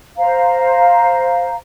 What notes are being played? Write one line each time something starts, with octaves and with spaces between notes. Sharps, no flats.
C5 F5 A#5